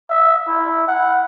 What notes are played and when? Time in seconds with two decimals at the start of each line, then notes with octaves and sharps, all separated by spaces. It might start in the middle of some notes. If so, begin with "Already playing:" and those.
0.10 E5
0.48 E4
0.88 F#5